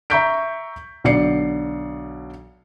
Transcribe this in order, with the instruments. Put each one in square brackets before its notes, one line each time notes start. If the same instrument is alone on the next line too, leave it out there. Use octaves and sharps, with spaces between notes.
[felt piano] E5 A#5 C#6 G6 B6 D7
B1 D3 D5 C7 C#7